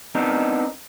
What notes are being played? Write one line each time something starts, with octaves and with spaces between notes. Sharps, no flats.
B3 C4 D4 D#4 A#4